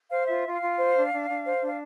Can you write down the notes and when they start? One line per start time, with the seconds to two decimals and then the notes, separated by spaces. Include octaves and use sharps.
0.10 C5 F5
0.27 F4 E5
0.44 F4
0.52 F5
0.60 F4
0.78 C5
0.94 D4
1.11 D4
1.27 D4
1.44 C5
1.61 D4
1.68 F5